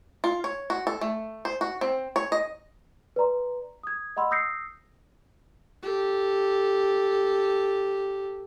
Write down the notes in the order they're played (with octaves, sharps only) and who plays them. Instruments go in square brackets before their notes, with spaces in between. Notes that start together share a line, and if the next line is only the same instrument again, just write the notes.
[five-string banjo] F4
C#5
F#4
A4
A3
C5
F#4
C4
C#5
D#5
[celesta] B4 D5 A#5 C6
D#6 G#6
D#5 F#5 B5 C6 E6
D#6 E6 G6 A#6 C7 C#7
[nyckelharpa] G4 A4